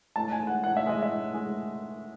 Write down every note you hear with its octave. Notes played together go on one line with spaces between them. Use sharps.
A2 A5
G#5
G#3
F#5
A2 F#5
E5
G#3 D#5
E5
A2
G#3